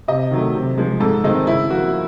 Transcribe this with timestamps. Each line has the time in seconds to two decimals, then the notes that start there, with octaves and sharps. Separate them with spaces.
0.08 C3 D#5
0.31 D#3 F#3 A3
0.55 C3
0.78 F3 G#3
1.00 G#2 A4
1.24 D#3 G#3 C4 D#4
1.47 C#3 E4
1.71 F3 A#3 F#4